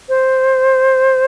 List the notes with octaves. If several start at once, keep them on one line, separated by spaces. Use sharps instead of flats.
C5